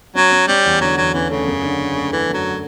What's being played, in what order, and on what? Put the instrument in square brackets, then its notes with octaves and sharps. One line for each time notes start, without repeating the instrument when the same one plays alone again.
[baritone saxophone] F#3 [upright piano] C#4
[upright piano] C#4
[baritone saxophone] G3 [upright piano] C#4
[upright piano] E2
[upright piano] D3 [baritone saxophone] F#3
[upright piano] E2 [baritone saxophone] F#3
[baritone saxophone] E3 [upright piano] C#4
[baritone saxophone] C#3 [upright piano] A3
[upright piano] F#2
D3
F#2
A3
[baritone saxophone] E3 [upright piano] A3
[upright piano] F#2 [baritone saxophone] F#3